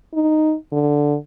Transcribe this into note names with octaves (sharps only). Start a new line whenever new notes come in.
D#4
D3